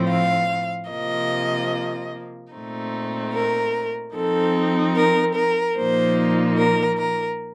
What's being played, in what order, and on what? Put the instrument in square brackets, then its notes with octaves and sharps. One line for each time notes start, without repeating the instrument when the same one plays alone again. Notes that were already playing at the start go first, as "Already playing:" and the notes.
Already playing: [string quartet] A2 F3 C4
F5
C3 F3 A#3 D#5
A#2 A3 C4 D#4
A#4
F3 C4 D#4 A4
A#4
A#4
A#2 F3 A#3 D#4 C5
A#4
A#4